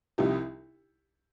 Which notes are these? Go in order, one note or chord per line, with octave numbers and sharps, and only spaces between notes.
C2 C3 F3 D#4 G4